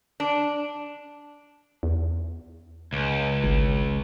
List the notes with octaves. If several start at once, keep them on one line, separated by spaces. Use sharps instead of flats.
D4
E2
C#2
G#1